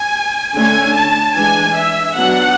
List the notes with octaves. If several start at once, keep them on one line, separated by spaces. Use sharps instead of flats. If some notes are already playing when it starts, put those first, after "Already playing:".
Already playing: G#5
D3 A3 C#4 G#5
A5
E3 G#3 D4 G#5
E5
F#3 B3 D4 F#5